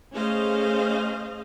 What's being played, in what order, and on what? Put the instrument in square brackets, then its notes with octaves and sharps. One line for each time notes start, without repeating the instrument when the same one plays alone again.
[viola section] A3 C#4 G#4 C5 D#5 F5